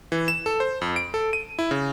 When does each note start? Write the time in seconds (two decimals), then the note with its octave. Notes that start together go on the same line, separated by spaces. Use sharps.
0.12 E3
0.28 E7
0.46 A4
0.60 C5
0.81 F2
0.96 D7
1.14 A4
1.33 D#7
1.59 E4
1.71 C#3